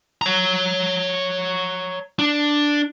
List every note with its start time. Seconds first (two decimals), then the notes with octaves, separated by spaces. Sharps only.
0.22 C#5 A#5
2.19 D4